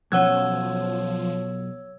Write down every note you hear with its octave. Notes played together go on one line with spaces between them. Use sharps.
B1 F3 C#4 C#5 F#5 E6 F#6 G#6